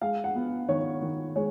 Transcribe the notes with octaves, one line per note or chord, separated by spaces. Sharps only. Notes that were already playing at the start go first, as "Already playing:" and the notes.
G#3 F5
F#5
B3
D#3 C#5
D#3
G#3 C#5